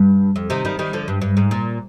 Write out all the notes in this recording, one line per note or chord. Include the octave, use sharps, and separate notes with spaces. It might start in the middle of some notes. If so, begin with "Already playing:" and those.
Already playing: G2
F2
C3 D#3
D#3 G3
D#3 G3
D3 F3
G2
G2
G#2
A#2